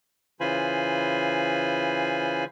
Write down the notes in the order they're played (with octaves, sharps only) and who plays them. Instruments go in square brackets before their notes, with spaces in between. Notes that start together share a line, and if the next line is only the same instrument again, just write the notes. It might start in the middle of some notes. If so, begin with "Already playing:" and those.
[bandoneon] C#3 E3 F4 C5 G#5 B5